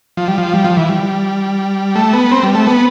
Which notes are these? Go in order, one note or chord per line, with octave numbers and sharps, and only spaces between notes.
F3
G3
F3
G3
F3
E3
G3
A3
B3
C4
G3
A3
B3